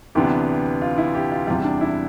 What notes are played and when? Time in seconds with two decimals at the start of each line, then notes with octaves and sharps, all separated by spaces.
0.15 D2 C3 E3 B3 D4 G4
0.81 F4
0.98 E4
1.15 G4
1.32 F4
1.47 E2 C3 G3 F4
1.64 D4
1.81 E4